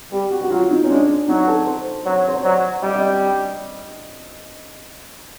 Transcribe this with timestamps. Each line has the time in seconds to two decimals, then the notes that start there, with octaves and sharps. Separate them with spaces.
0.12 G3 G4
0.31 F#4
0.42 F#4
0.50 F#3 F4
0.70 D#4
0.84 C#4
0.89 G#3 D4
1.28 F#3 D#4
1.47 A4
1.66 C5
2.05 F#3 C#5
2.28 C5
2.35 C#5
2.44 F#3 D5
2.82 G3 D#5
2.95 D#5